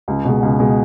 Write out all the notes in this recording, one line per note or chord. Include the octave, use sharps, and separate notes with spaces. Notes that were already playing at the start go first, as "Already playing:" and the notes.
C#2
B2 G#3
C#2
B2 G#3